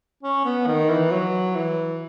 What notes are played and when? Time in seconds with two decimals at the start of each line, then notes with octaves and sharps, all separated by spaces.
0.23 C#4
0.45 B3
0.67 D#3
0.89 E3
1.11 F#3
1.55 E3